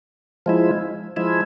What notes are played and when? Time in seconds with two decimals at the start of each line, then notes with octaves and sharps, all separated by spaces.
0.46 F3 G#3 E4
1.16 F3 G#3 E4